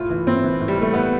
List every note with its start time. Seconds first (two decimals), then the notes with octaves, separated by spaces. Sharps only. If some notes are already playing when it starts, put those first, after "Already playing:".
Already playing: A2 F4
0.10 E3
0.27 A2 C4
0.44 E3
0.60 A2
0.68 G3
0.78 E3 A3
0.94 A2 B3